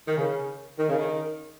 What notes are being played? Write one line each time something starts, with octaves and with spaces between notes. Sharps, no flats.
D#3
C#3
D#3
C#3
D#3